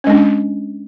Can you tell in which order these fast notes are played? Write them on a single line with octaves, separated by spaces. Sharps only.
C#4 G#3 D4